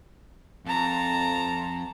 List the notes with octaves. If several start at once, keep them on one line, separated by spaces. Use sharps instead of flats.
F2 A5 A#5